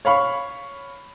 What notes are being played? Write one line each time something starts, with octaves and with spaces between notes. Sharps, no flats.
C#5 F5 B5 C#6